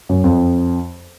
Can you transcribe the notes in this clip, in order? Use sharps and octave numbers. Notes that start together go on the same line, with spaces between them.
F#2
F2